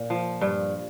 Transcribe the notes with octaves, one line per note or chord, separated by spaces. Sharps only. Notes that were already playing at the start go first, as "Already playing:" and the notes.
Already playing: A#2
F3
G2